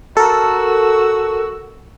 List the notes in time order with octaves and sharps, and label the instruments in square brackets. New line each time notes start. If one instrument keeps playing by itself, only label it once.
[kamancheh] F#4 E6 [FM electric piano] A4 A#4